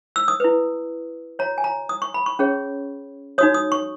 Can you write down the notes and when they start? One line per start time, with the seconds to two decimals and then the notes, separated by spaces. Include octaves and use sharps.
0.16 E6
0.28 D#6
0.40 E4 B4
1.39 F#4 C#5 A#5
1.58 G#5
1.64 A#5
1.89 D#6
2.02 C#6
2.14 B5
2.26 C#6
2.39 C#4 G#4 C#5
3.38 D#4 F#4 C#5 D#6
3.54 D#6
3.72 C#6